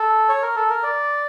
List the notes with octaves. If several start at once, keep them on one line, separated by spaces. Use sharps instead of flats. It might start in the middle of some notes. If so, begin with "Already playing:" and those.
Already playing: A4
C#5
A#4
A4
A#4
D5